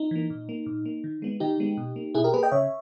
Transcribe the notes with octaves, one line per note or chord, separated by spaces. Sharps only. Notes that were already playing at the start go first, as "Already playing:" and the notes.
Already playing: D#4
E3 A#3
A#2
A#3
A#2
A#3
D#3
G#3 B3
D#3 D#4 G4
G#3 B3
B2
A#3
B2 E4 G#4
G4 A#4
A#3 G#4 B4
D#5 G5
C#3 C#5 E5